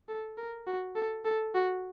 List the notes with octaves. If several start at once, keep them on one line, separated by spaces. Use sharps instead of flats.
A4
A#4
F#4
A4
A4
F#4